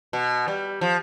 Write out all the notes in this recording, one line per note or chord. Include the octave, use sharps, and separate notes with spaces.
B2
G3
F3